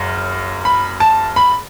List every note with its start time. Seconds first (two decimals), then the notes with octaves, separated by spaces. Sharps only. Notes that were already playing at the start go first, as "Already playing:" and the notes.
Already playing: F#1 F#2
0.65 B5
1.00 A5
1.36 B5